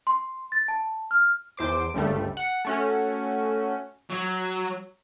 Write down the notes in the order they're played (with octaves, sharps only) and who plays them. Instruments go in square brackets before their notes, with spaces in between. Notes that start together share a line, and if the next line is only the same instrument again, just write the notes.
[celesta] C6
A6
A5
F6
[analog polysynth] E2 C5 D6
G1 C#2 G3 A3
F#5
A3 C#4 F#4
[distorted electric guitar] F#3